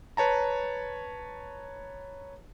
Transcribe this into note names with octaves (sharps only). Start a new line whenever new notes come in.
B4 C#5 A5 A#5